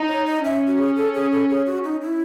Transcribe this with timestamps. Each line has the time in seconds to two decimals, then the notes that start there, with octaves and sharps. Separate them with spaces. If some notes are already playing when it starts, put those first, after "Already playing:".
Already playing: D#4
0.08 C#5
0.27 D#5
0.44 C#4 E5
0.67 F#4
0.78 G#4
0.96 A4
1.15 G#4
1.32 A4
1.49 G#4
1.66 F#4
1.84 D#4
2.02 E4